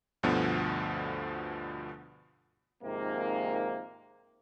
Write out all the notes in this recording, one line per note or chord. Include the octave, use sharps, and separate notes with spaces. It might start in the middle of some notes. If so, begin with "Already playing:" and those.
D2 G2 B2 D3 F3 B3
G#2 C3 D#3 F3 A#3